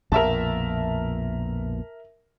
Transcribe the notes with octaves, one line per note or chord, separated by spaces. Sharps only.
A#1 F2 B2 A#4 E5 A5